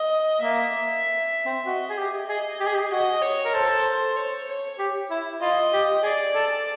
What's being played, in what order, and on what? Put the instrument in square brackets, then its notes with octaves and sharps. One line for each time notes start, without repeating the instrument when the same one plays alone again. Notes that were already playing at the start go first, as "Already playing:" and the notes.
Already playing: [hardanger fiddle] D#5
[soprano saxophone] A#3 [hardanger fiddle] E5
[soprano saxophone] C4
[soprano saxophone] F#4 [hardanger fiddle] D#5
[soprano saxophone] G#4
G4
[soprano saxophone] G#4 [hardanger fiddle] D#5
[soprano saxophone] G4
G#4
G4
[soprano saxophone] F#4 [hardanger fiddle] D#5
[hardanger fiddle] C#5
[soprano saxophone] A#4
[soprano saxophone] A4 [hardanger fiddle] C5
[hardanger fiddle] C#5
C#5
[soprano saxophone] G4
E4
[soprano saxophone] F4 [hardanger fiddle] D#5
[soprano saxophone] G4
[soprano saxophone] G#4 [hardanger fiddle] D5
[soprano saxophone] A4